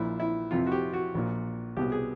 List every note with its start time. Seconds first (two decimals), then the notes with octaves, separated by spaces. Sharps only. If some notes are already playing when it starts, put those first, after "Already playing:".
Already playing: A#1 A#2 E4
0.20 E4
0.51 F2 C3 E3 F4
0.67 F#4
0.72 G4
0.93 F#4
1.15 A#1 A#2
1.77 C2 B2 G4
1.92 G#4